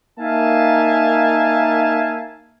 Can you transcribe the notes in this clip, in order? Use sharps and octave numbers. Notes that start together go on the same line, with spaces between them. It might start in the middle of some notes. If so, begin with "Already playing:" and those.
A#3 D#4 E5 F5 G#5 A5